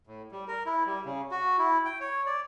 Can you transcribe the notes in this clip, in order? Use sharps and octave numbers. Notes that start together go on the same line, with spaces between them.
A2
G3
A#4
E4
G3
C#3
F#4
E4
G5
C#5
D5